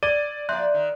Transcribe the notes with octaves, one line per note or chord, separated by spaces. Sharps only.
D5 G#6 D#7 G7
F3 A#3 D5 E5 C6 F#6 G6
D#3